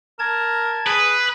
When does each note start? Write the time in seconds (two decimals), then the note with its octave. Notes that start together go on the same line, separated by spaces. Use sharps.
0.19 A#4 A5 G#6
0.86 G#4 B4